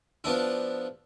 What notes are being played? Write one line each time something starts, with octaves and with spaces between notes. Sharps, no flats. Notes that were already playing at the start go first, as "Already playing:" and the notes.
F3 B3 D4 E4